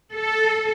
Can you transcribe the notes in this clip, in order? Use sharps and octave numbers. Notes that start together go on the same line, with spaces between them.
A4